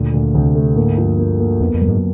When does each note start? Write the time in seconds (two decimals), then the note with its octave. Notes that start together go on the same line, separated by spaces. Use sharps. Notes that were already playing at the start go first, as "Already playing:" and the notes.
Already playing: D2 A#2
0.14 D2
0.34 D2 C3
0.55 A3
0.76 A2 A#3
0.91 G#2
0.98 F3
1.04 G2
1.19 A#3
1.40 A#3
1.60 F2 B3
1.74 F2
1.81 F#2
1.88 G#2